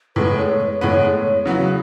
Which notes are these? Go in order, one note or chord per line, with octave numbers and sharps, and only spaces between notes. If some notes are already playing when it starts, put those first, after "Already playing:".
A2 G#3 B3 B4
C#5
C#5
A2 G#3 B3 C#5
C#3 F#3 B3 E4 F#4